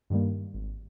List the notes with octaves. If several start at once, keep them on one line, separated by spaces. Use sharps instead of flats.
G2 D#3 G3 A#3
G#1